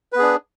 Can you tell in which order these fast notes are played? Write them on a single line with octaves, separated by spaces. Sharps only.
B4 B3 G#4 D4